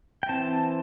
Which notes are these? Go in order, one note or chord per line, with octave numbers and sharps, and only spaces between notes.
G5
E3 C4 A5